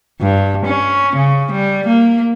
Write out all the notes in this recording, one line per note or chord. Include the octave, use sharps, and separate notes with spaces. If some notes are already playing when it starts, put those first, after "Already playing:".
G2
C#4
C#3
G3
A#3